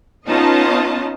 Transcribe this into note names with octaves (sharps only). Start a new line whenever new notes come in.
B3 C#4 D#4 F4 D#5 A5